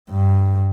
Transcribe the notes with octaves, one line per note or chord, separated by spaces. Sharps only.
G2